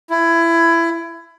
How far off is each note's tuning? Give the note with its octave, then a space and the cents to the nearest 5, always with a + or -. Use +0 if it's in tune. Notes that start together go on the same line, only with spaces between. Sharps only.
E4 +20